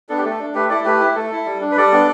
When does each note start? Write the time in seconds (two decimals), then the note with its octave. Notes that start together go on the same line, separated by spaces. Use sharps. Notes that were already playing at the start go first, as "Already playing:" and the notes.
0.09 B3 D4 A4
0.18 G4
0.24 A3 A4
0.39 D4
0.54 A3 G4 B4
0.70 E4 A4 D5
0.85 A3 G4 B4
1.00 E4
1.15 A3 A4
1.32 E4
1.46 G3
1.61 D4
1.71 B4
1.77 G3 A4 D5
1.92 B3 D4